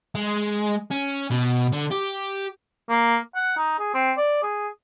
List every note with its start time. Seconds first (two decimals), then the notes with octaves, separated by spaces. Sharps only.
0.15 G#3
0.91 C#4
1.30 B2
1.72 D3
1.91 G4
2.89 A#3
3.36 F#5
3.57 D#4
3.79 G#4
3.94 C4
4.17 D5
4.43 G#4